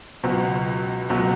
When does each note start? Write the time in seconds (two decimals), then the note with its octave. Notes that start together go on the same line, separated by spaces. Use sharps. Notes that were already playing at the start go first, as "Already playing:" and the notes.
0.23 C#2 B2 F#3
1.10 C#2 B2 F#3